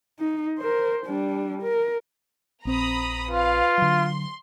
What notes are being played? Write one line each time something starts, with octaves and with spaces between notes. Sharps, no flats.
D#4
A#4 C5
G3 D4
A#4
A#1 C4 C5 A#5 B5 D#6
F4 B4 F5
D3 F#3 C6